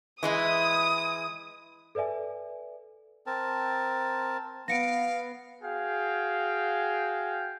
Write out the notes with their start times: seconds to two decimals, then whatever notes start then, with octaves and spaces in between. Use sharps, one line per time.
0.23 E3 G#3 E4 D#6
1.95 A4 B4 D5 E5 G#5
3.27 C4 A#4 A5
4.68 B3 F5 A#6 C#7 D7
5.62 F#4 G#4 F5 G5